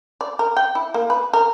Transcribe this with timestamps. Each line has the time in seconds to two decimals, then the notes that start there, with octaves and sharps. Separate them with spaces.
0.21 D5
0.39 A#4
0.57 G5
0.75 E4
0.94 A#3
1.10 B4
1.33 A#4